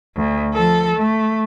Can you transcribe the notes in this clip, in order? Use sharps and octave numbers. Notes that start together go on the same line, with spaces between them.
D2
F3 A4
A3